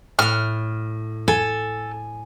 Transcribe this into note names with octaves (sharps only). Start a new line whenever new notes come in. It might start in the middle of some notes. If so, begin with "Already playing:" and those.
A2 F#5 F6
A4 G#5